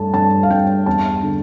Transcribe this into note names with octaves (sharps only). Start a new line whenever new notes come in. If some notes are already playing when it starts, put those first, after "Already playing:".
Already playing: G2 A3 A5
G2 A5
F5
G2 G5
E2 A5
D3